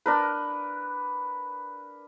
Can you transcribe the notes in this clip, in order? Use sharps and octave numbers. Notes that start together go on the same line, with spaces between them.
D4 A#4 B4